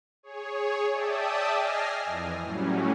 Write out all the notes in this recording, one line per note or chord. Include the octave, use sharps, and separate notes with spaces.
G#4 C#5
D5 E5 G5 A5 D#6
D#5 G#5 F6 A#6 C7
F2 E3
A2 F#3 G3 C#4